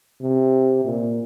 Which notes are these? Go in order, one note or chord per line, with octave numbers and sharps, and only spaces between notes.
C3
A#2